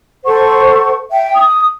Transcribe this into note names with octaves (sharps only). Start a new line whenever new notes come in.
A4 C5 F#5 C#6
E5 G5
D#6